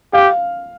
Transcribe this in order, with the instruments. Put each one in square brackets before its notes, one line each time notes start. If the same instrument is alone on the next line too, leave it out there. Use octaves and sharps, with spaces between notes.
[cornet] G4 [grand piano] F5